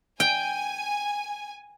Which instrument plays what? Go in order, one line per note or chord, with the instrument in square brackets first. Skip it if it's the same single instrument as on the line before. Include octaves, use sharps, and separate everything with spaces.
[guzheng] G5 [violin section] G#5